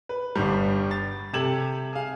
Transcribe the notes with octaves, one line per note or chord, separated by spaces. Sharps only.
B4
G1 G2 G3
A6
C3 G4 A4 G#6 E7 F#7
G#4 F5